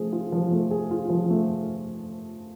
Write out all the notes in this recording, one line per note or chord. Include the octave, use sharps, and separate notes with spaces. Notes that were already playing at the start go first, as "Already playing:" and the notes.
Already playing: F3 A3 G#4
F4
F3
A3
G#4
F4
F3
A3